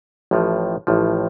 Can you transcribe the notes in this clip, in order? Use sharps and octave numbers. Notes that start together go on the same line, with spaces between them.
A1 A2 F3
A1 A2 F3